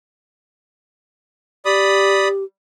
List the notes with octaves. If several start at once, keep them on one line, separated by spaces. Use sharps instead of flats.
G4 D5 B5 D#6